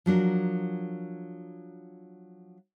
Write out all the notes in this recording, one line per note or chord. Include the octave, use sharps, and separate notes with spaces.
F3 F#3 D4 A#4